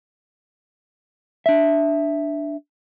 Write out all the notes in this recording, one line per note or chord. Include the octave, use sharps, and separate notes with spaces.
D4 E5